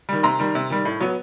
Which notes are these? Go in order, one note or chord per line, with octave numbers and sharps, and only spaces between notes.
D#3 G3
C3 A#5 C6
D#3 G3
C3
D#3 G3
A2
F#3 B3